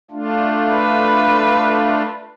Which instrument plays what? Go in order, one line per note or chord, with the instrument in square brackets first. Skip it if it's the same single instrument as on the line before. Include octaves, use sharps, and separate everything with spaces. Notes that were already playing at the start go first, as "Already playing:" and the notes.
[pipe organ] A3 D4 F4
[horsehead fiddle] B4